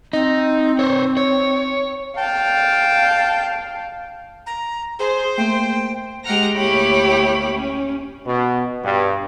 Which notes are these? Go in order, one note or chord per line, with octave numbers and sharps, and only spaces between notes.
C4 D#4
C5 C#5
C#5
F5 G5 A5
A#5
G#4 C5
A3 A#3 G5
G#3 G4 F#5 A#5 F6 A#6
D2 A#3 E4 G4 C#5 B5
C#4
B2
G2